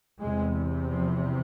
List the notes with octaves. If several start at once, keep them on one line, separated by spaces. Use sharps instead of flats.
E2 C3 G#3
F3